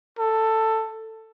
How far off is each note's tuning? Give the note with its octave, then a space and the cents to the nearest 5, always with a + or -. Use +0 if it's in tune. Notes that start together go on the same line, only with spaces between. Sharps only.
A4 +10